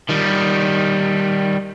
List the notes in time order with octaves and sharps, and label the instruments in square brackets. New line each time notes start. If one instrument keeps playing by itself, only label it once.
[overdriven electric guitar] D#3 G3